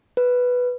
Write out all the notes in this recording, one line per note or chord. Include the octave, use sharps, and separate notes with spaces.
B4